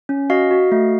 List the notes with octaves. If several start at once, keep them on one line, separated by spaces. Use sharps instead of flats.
C#4
F#4 D#5 F5
F#4
A3